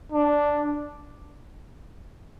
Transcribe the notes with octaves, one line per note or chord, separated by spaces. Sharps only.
D4